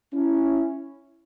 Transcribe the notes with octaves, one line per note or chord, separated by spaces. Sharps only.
C#4 E4